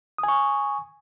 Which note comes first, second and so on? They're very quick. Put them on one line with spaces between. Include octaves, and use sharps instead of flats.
D#6 G#5 C#6